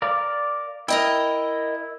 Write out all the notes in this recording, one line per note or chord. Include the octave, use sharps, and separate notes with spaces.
A#4 D5 F5
E4 A#4 D#5 G5